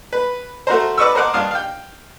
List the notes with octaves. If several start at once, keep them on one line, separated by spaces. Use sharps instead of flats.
B4
A3 F#4 A#4 C5
B4 D5 D#5 C#6 E6
A#4 C5 D#5 F#5 D6 F#6
G2 D4 F5 D#6
F5 G5